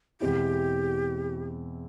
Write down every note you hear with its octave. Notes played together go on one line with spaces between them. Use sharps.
E2 B2 G#3 C4 E4 G4